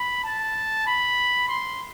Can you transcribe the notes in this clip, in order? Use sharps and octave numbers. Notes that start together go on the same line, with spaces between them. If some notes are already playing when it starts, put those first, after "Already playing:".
Already playing: B5
A5
B5
C6